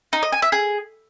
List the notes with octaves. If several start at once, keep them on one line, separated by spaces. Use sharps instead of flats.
D#4
D#5
G#5
E5
G#4